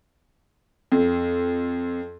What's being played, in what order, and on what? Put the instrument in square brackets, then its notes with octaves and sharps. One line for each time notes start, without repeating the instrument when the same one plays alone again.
[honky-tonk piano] F2